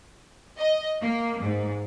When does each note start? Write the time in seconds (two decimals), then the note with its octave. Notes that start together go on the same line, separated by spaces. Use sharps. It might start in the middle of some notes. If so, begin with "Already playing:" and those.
0.58 D#5
1.01 A#3
1.41 G#2